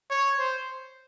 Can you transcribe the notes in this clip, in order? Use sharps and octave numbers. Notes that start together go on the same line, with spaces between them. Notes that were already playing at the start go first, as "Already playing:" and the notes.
C#5
C5